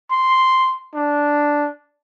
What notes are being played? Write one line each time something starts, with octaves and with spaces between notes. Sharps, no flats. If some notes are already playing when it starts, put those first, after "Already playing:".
C6
D4